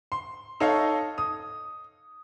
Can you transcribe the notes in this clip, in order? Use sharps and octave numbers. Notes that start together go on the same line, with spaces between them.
C6
D#4 A4 C#5 D#5 F5
D#6